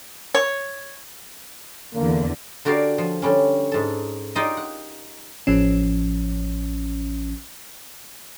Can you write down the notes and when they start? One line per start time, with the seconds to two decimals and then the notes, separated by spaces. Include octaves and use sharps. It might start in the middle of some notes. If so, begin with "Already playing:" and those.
0.35 C#5
1.95 E2 D3 A#3
2.65 D3 F#4 G4 A#4 D5 F5
2.98 F3
3.22 D3 G3 C#4
3.72 G#2 A4
4.35 D#4 F4 G4 A#4 D#5
4.57 F#5
5.47 A1 F3 C#4